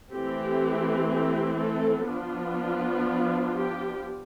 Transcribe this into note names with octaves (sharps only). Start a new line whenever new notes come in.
E3 A3 C4 G4
G4
A3 A4
F3 B3 D4 F4
G4